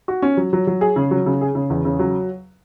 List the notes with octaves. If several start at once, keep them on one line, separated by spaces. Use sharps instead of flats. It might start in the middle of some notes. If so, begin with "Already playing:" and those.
F#4
C#4
F#3
F#3
F#3
G#4
C#3
F#3
C#3
G#4
C#3
E2
C#3
F#3